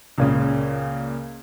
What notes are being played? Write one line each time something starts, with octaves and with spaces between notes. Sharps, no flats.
C#2 A#2 C#3